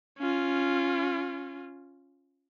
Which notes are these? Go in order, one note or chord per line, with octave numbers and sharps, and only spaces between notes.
C#4 F4